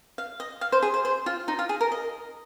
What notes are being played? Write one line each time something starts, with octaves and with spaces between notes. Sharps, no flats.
F5
D#5
F5
C5
G#4
C5
C5
F4
D#4
F4
G#4
A#4
D#5